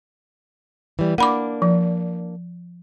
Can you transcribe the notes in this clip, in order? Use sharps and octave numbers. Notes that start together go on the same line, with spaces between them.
E3 G3
A#3 D4 F#5 B5 D6
F3